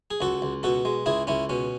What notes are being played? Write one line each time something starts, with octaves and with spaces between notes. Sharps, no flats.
G#4
C#2 F#4 A4
C#2
B2 F#4 A4
G#3
C#2 E4 G#4
C#2 C#4 E4
B2 C#4